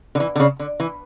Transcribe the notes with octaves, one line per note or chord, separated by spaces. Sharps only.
D3
E3
D3
C#3
D3
E3